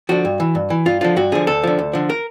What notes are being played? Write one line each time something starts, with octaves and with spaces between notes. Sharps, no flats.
D3 F3 F#4
G2
E3
G2
E3
G2 F4
D3 F3 F4
G2 F#4
D3 F3 G#4
D2 A4
D3 F3
D2
D3 F3
A#4